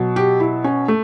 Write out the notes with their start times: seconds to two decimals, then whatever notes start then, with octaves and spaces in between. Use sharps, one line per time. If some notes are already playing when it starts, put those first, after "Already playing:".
Already playing: B2 F#3
0.16 G4
0.40 E4
0.64 C#4
0.88 A3